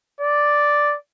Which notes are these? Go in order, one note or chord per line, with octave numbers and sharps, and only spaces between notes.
D5